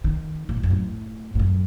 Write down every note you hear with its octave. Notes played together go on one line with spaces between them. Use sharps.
D#3
A#2
A2
F#2
A2
A2
F#2